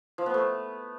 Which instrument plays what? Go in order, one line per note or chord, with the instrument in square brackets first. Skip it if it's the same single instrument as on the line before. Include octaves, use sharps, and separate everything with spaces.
[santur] F3
B3
A3